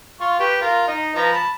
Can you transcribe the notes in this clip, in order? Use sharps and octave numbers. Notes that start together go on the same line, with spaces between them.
F4 C#6
G4 B4
F4 A#4
D#4
F3 B4 A#5
A5 B5